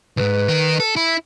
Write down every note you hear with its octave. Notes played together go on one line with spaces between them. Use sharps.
C2 G#2 B4
D#3 A#4
A4
E4